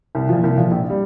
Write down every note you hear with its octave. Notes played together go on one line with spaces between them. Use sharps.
C2
A#2 F3
C2
A#2 F3
A#1
G3